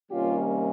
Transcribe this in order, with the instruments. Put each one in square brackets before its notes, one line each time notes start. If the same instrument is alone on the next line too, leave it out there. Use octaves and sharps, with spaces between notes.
[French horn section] C3 D#3 G3 A#3 C#4 F4 G4